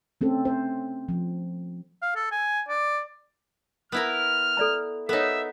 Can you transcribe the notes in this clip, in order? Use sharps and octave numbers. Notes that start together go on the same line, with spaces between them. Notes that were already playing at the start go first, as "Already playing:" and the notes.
A3 C4 C#4 A4
C5
F3
F5
A4
G#5
D5
B3 E4 A#4 F6
A4 D5 A#5
B3 D#4 A4 A#4 C#5 E5